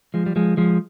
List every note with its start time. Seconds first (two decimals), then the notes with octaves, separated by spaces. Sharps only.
0.14 F3 G#3
0.26 G3
0.36 F3 G#3
0.57 F3 G#3